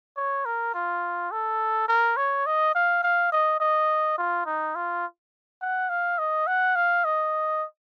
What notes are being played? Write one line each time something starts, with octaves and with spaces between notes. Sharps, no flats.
C#5
A#4
F4
A4
A#4
C#5
D#5
F5
F5
D#5
D#5
F4
D#4
F4
F#5
F5
D#5
F#5
F5
D#5